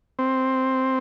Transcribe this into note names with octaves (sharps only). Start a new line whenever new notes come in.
C4